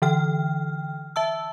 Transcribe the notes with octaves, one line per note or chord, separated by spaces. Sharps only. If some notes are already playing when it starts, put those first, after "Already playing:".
D3 E3 G5 F6
E5 A5 E6